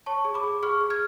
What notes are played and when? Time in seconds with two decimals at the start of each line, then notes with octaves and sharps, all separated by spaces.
0.06 C#5 A5 C#6
0.25 G#4
0.34 B5 D6
0.44 G#4
0.63 G#4 C#6 F6
0.81 G#4
0.90 F6 G#6